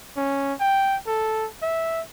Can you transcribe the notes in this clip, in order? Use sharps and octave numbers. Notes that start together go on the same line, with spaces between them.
C#4
G5
A4
E5